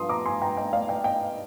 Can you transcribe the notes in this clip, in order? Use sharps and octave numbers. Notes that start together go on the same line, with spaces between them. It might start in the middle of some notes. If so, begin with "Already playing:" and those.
Already playing: G2 F3 C6 D#6
A#5 D6
G#5 C6
G5 A#5
D#5 G5
D5 F5
D#5 G5
D#5 G5